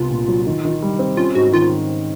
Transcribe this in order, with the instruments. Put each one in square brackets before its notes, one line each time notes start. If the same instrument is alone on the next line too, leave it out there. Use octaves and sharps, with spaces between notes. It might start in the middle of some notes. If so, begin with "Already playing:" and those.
Already playing: [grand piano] C2 B3 [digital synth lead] F4
[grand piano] A#2
F#3
D#3
D#3
G3
C4
[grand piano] C#4 [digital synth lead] F4
[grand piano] G#2 [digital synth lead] F#4
[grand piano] D#3 [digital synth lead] F4